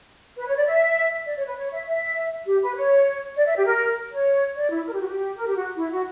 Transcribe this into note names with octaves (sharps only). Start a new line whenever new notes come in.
B4
C#5
D5
E5
D5
C#5
B4
C#5
E5
E5
G4
B4
C#5
D5
E5
G4
A#4
C#5
D5
E4
A#4
G4
F#4
G4
A#4
G4
F#4
E4
F#4